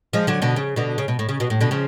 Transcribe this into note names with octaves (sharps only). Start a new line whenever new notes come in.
F3 G#3
D3 F#3
B2 D3
C#3
B2 D3
C#3
B2
A2
C#3
B2
A2
B2 D3
C#3 F3